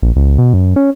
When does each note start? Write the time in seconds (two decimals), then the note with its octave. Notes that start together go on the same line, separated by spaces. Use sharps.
0.02 A#1
0.16 C#2
0.38 B2
0.53 F#2
0.76 C#4